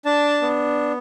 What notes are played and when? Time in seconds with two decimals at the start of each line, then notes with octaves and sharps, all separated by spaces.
0.05 D4 A5
0.42 B3